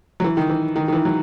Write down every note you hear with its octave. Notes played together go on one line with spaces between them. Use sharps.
F#3
E3
D#3
E3
D#3
D#3
E3
F#3